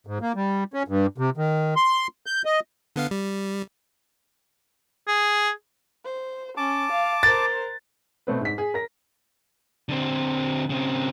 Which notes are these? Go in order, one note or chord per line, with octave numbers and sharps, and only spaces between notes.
G#2
A#3
G3
C#4
G2
C3
D#3
C6
G6
D#5
D3 B3 F5
G3
G#4
C5
C#4 A5 D6
F5
A#4 C5 A6
B2 A3 C4 B4
G#2 B6
G#4
A#4 A#6
D3 C4
C#3 C4